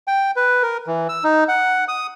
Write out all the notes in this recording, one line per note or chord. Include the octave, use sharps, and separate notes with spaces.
G5
B4
A#4
E3
E6
D#4
F#5
D#6